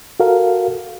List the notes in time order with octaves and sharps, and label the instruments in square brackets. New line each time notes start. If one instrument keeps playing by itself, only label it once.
[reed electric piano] F#4 A4 A#4 F5